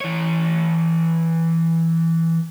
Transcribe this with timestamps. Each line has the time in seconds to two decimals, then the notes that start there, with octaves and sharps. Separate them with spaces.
0.01 E3 C#5